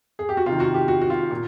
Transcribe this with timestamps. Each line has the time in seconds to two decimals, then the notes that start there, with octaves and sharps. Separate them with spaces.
0.19 G#4
0.29 G4
0.37 F#4
0.46 C3 D#3 F4
0.60 F#4
0.74 G4
0.88 F#4
1.02 F#4
1.10 F4
1.30 A#2